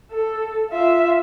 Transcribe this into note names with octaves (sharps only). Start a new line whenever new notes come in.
A4
F4 E5